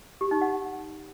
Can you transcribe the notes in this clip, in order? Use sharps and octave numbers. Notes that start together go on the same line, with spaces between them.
G4
D#4
F#5